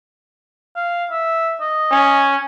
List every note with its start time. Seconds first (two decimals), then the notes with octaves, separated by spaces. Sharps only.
0.76 F5
1.11 E5
1.61 D#5
1.91 C#4